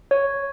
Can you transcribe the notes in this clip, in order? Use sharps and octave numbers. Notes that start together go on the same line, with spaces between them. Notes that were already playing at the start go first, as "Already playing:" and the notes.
C#5